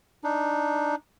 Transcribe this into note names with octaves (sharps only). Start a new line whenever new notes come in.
D4 D#4